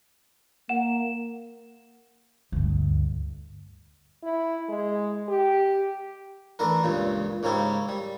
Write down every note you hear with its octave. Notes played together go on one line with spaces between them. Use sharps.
A#3 F#5 E7
D2 G2
E4
G#3
G4
E3 A3 D4 E4 A#4
C#2 G2 A#2 C#3
G#2 C#3 A#3 C#4 E4 G4
G3